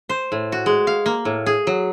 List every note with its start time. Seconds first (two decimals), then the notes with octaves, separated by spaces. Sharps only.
0.09 C5
0.32 A2
0.52 F#4
0.66 G#3
0.87 F5
1.06 A#3
1.25 A2
1.46 G#4
1.67 F#3